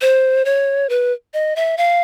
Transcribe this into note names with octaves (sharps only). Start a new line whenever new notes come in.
C5
C#5
B4
D#5
E5
F5